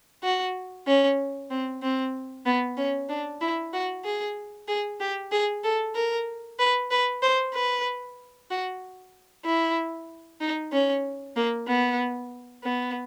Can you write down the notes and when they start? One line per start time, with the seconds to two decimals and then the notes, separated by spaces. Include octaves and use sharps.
0.23 F#4
0.87 C#4
1.50 C4
1.82 C4
2.46 B3
2.77 C#4
3.09 D4
3.41 E4
3.73 F#4
4.05 G#4
4.68 G#4
5.00 G4
5.32 G#4
5.64 A4
5.95 A#4
6.59 B4
6.91 B4
7.23 C5
7.54 B4
8.50 F#4
9.45 E4
10.41 D#4
10.72 C#4
11.36 A#3
11.68 B3
12.63 B3